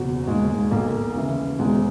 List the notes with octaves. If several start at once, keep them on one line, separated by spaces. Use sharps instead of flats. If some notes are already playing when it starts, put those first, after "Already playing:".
Already playing: F#1 E2 B2 F#4
E1 D#2 D#3 G#3
G#3
B1 B2 A#3
D#2 C#3 E3
E1 E2 D#3 G#3